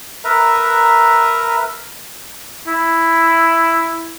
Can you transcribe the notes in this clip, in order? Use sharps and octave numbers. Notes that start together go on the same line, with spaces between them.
A#4 B4 E5 A#5
E4